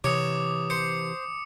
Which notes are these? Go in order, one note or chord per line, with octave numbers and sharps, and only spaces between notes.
C3 E3 C#5 D6 D#6
C5 C#7